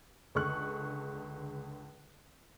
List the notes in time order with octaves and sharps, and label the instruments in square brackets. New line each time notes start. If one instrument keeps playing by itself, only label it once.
[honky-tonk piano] C#2 D3 G#4 C#6 F#6